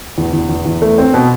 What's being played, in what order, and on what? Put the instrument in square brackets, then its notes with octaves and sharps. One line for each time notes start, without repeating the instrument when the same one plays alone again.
[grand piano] E2
E2
E2
E2
A3
C4
B2